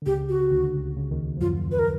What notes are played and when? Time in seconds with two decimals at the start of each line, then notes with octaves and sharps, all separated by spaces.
0.02 D3
0.06 C#2 C#3 G4
0.29 F#4
0.51 D2 D3
0.64 D3
0.74 C#2 C#3
0.96 C#2 C#3
1.11 D#2 D#3
1.37 F3
1.41 F#2 F#3 F4
1.72 B4
1.79 A#4